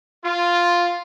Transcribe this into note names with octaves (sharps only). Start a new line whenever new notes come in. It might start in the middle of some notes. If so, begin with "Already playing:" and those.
F4